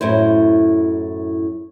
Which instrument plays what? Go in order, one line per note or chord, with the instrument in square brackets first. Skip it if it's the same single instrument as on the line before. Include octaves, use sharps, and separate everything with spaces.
[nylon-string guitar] F#2 A2 E4 C5